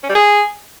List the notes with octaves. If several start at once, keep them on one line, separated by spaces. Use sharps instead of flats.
C#4
G3
G#4